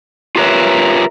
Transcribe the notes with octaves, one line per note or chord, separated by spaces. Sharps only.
F4 G4 A#4 B4 C#5 E5